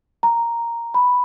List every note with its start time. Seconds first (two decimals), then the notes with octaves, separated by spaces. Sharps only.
0.23 A#5
0.94 B5